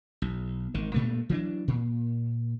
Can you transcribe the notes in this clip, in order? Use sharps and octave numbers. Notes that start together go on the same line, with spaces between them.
B1
G#1 D#3
G2 A#2 A3
E3 F#3 A3 D4
A#2